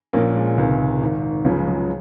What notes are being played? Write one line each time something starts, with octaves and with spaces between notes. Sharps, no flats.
A#1 A#2 F3 A#3 C#4
G#3
C#2 C3 D#3
G#1 G#2 D#3
C#2 C#3 F3 F#3
G#3
F#3
G#3